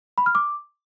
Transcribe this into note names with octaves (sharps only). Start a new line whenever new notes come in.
B5
F6
D6